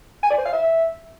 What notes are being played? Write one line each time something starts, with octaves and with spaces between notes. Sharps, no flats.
G#5
D5
C5
F5
E5